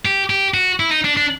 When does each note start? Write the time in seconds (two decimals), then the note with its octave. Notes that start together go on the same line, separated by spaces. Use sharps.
0.05 G4
0.30 G4
0.54 F#4
0.80 E4
0.91 D#4
1.04 D4
1.17 D4